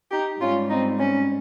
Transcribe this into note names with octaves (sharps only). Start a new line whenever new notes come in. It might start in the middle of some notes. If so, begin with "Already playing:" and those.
D#4 G4
G#2 G3 C#4 F4
C4 D#4
C#4